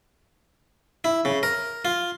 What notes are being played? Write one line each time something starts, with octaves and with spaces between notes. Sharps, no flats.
E4
C#3
A#4
F4